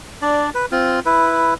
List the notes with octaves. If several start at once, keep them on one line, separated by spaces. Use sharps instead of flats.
D4 D5
B4
C4 F4
E4 B4